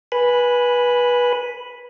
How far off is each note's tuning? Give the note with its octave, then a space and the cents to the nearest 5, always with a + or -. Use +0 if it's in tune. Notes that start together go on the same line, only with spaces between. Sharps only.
B4 -20 G#5 +0 B5 +0